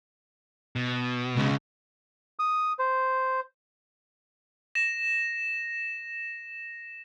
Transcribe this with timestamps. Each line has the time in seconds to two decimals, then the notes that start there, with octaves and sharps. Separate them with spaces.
0.76 B2
1.36 C#2 C#3
2.39 D#6
2.79 C5
4.75 A#6 E7